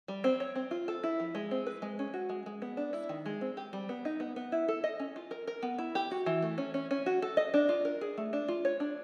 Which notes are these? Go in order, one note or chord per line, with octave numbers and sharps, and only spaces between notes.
G3
C4
C#5
C4
F4
A4
E4
F3
G#3
C4
B4
G#3
C#4
F#4
G#3
G#3
B3
D4
E4
D#3
G#3
C4
G4
G3
B3
D#4
B3
B3
E4
A4
D#5
C#4
F4
A#4
A#4
B3
E4
G4
F#4
E3
A3
C#4
C#4
C#4
F#4
A4
D#5
D4
F4
A#4
G#4
A3
D4
F4
C#5
D4